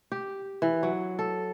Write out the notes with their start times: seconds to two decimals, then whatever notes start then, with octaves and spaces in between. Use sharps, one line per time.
0.12 G4
0.62 E3
0.83 F#3
1.19 A4